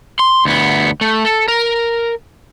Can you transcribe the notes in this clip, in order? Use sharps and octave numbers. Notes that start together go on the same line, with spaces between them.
C6
D2 B3
A3
A4
A#4